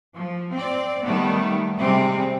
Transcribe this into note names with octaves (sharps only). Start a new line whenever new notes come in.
F3
C4 D5
D#3 G3 A3 B3
C3 G3 G#3 C4